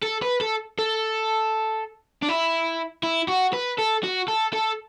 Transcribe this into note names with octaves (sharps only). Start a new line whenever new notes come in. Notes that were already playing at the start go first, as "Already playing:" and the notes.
A4
B4
A4
A4
D4
E4
E4
F#4
B4
A4
F#4
A4
A4